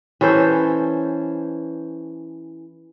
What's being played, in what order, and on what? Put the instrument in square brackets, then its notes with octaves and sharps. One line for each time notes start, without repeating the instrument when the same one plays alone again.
[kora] E3 C#4 A4 C5